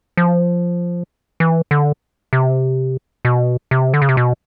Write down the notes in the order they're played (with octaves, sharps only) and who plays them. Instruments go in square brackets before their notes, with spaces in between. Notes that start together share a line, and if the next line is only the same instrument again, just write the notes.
[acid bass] F3
E3
D3
C3
B2
C3
D3
C#3
C3
B2